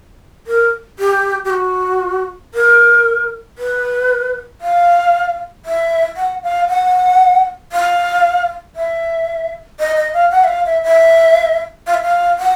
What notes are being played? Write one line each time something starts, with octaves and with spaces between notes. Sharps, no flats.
A#4
G4
G4
F#4
A#4
B4
F5
E5
F#5
F5
F#5
F5
E5
D#5
D#5
F5
F#5
E5
F5
E5
E5
F5
E5
F5
F#5